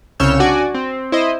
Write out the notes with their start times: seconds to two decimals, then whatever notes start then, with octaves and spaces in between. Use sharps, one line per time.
0.20 C2 C#3 C#5 E6 F6 G6
0.40 D4 F#4 D5 G#5
0.75 C4
1.12 E4 C5 D#5